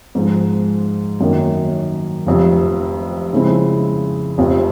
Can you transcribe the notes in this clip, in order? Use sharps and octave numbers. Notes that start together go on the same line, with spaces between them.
G#2 F3 G#3
F#2 D#3 F#3 A#3 C#4
F1 F2 C3
C#3 F3 G#3 C4 E4
F1 F2 C3